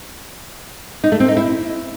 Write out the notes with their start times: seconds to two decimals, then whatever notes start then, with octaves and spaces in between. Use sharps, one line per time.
1.04 D#4
1.12 A3
1.20 C4
1.28 D#4
1.37 E4